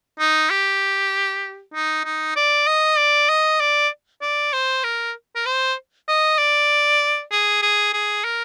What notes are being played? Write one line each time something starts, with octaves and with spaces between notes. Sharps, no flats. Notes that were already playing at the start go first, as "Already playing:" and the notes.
D#4
G4
D#4
D#4
D5
D#5
D5
D#5
D5
D5
C5
A#4
A#4
C5
D#5
D5
G#4
G#4
G#4
A#4